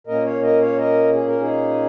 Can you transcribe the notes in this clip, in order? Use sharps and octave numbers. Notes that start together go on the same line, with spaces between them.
A#2 A#3 C#4 A#4 D#5
C#5 F5
A#4 D#5
C#5 F5
A#4 D#5
G#4
A#4
D#4 G#4